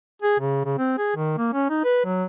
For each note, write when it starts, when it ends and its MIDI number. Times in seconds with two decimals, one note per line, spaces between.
0.22 0.36 68
0.39 0.62 49
0.65 0.76 49
0.78 0.96 60
0.98 1.11 68
1.16 1.33 51
1.38 1.49 58
1.54 1.66 61
1.70 1.80 63
1.84 2.00 71
2.05 2.26 54